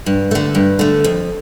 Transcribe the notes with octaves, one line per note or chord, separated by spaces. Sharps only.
G2
D3 A3
G2
D3 A3
F2